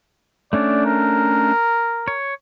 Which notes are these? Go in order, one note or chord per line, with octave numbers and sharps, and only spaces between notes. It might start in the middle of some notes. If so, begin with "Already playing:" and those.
A3 C#4 D4 D5
A#4
C#5